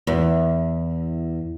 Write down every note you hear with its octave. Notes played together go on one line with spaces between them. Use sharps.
E2